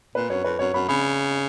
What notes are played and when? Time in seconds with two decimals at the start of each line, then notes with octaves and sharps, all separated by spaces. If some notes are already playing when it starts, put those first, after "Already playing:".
0.15 A#2 B4
0.29 F#2 C#5
0.44 F2 B4
0.59 F#2 C#5
0.74 F#2 B5
0.88 C#3 B5